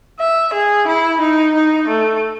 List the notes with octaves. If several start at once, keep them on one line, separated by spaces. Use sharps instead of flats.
E5
G#4
E4
D#4
D#4
A3